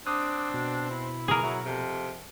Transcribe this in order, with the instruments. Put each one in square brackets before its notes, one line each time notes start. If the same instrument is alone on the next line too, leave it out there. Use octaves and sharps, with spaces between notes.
[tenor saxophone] C4 [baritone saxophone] D4 [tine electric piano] D6 D#6 F#6
[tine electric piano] B2
[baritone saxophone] E4
[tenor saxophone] A#3 [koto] G#4 A#4
[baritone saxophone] F#3 [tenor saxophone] E4
[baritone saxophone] F2 [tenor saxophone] C3